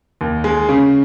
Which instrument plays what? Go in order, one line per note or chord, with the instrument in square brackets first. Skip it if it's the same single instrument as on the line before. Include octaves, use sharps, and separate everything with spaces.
[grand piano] D#2
G#3
C#3